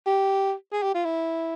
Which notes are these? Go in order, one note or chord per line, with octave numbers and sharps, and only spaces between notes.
G4
G#4
G4
F4
E4